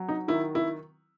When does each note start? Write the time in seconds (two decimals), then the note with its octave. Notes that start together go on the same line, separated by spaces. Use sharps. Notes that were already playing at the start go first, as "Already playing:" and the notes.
Already playing: F#3
0.09 D#4
0.28 D#3 E4
0.55 E4